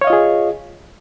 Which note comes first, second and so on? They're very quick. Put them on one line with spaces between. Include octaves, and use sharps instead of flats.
C#5 F5 D#5 F4 G#4